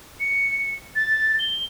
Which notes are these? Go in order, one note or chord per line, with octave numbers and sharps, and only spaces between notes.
C#7
A6
G7